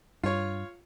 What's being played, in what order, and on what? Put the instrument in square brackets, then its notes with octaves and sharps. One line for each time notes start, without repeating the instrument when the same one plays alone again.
[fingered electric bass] G2 [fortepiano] F4 C#5